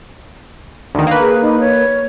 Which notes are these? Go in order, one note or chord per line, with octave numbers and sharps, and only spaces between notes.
D2 D#3
A#3 B4
G#4
D#4
C#5